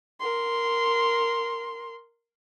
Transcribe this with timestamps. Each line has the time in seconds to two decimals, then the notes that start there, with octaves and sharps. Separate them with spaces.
0.20 A#4 C6